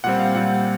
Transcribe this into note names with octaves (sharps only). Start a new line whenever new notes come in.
A#2 G3 C4 F#5
F5
A#2 G3 C4 F#5